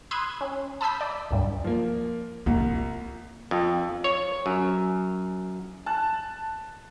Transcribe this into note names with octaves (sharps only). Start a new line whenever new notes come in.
B5 C6 D#6 E6 F#6 G#6
C#4
A5 B5 D#6 E6 G6 B6
D5
C#2 G2 G3
F3 A#3
C2 A#3 F4
F2
C#5
F#2
A5 F#6